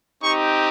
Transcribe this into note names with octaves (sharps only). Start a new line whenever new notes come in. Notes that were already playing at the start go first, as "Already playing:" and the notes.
C4 D#4 G4 C#6